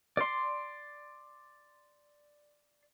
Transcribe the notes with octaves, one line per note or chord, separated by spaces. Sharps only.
D5 C6